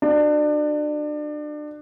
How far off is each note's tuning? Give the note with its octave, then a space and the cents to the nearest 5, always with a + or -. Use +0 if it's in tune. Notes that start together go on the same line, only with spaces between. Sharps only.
D4 +30 F#4 +0